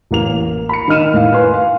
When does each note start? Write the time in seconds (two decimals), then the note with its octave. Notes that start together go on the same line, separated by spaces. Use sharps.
0.11 A1 A#3 F7
0.69 B5 C#7
0.88 D#3 A#4 D#5 F6 D#7 E7
1.14 A2 F5
1.32 B4 G#5 C6
1.54 F5